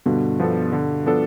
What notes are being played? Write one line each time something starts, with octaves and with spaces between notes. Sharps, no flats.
G2 B2 D3
F3 B3 D4 A4
D3
F3 B3 D4 A4